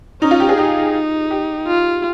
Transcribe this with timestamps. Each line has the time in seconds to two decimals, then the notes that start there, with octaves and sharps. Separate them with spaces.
0.22 C#4 D#4
0.31 F4
0.40 G4
0.49 G#4
0.57 D#4 G4
1.31 G4
1.67 F4